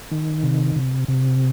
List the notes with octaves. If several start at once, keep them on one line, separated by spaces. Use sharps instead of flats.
D#3
C3
C3
C3